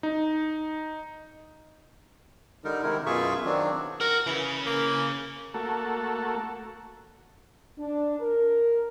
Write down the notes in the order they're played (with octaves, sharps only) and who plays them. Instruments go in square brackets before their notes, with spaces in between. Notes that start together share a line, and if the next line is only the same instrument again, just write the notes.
[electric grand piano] D#4
[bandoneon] D3 G3 D#4 A#4
C3 D#3 G#3 E4 A#4
F#2 B2 F4 G#4 E5 C#6
D#3 F#3 C4 D4
[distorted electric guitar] F#4 [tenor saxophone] A#4
[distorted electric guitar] C#3 C#4 [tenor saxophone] E3
[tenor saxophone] A#3
[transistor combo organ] A3 A#3 F#4 A4
[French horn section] D4
A#4